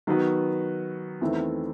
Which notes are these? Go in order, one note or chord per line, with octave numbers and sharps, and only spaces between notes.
D#3 F#3 B3 F#4 B4
E2 D#3 A3 C4 E4